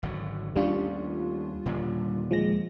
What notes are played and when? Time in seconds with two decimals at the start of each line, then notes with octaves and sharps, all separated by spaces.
0.03 G#1 D3 F#3
0.56 D#2 G3 A3 C#4 D4 F4
1.65 D#2 A#2 D3
2.31 F3 G#3 A#6